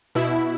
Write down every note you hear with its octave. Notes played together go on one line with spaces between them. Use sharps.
B2 E4